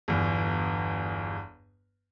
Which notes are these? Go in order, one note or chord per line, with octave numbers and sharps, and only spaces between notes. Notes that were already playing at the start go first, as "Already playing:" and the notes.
G1 E2